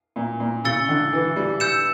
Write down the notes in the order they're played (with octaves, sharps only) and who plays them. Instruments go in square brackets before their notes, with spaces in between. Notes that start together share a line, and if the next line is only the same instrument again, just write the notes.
[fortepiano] A#2
A#2
[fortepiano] C#3 [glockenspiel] E6 A6 C#7 G7
[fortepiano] D3
E3
G3
[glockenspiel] E6 G6 C#7 E7